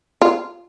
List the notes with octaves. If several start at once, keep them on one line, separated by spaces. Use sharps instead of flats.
F4